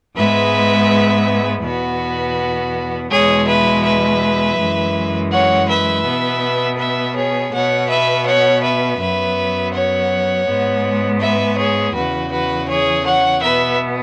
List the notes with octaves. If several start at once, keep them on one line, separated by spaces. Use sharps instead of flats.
G#2 G#3 B3 B4 E5
E2 B2 B3 F#4 B4
E2 B2 G#3 G#4 C#5
B4 E5
B4 E5
F#2 E3 G#3
C#5 F#5
B4 E5
B2 B3
B4 E5
G#4 C#5
B2 B3 C#5 F#5
B4 E5
C#5 F#5
B4 E5
F#2 F#3 B3 B4 E5
C#5 F#5
G#2 G#3 B3
B4 E5
G#4 C#5
E2 C#3 E3 F#4 B4
F#4 B4
G#4 C#5
C#5 F#5
B2 B3 B4 E5